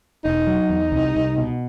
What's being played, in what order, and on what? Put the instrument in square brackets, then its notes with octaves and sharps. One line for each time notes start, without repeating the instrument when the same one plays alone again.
[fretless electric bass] E1 [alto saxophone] D#4
[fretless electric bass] F#3
E2
C2
C2
B2